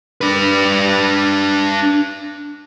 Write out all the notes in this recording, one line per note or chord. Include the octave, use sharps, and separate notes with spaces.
D4 B4